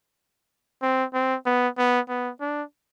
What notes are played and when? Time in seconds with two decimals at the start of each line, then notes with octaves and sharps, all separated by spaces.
0.82 C4
1.13 C4
1.46 B3
1.78 B3
2.09 B3
2.40 D4